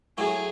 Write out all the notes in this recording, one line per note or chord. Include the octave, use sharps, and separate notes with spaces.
A2 F#3 A3 G#4